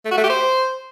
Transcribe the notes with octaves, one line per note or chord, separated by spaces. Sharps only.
A3
F#4
A3
G4
C5